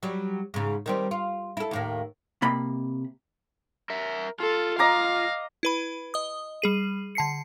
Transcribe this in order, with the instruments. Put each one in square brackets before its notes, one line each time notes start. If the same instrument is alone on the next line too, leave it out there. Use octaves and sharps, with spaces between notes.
[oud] F#3 G3
G#2 C#3
D#3 G3 C4
F4
E4 A4
D#2 A2 A#3
[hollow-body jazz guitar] C3 A#3 B5
[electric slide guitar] A#4 E5
[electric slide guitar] F4 [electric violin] A4
[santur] D#5 A#5 D6 [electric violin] F5
[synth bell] E4 B4 B5
D#5 D#6
G3 G#4 D#7
D3 A5 C7 C#7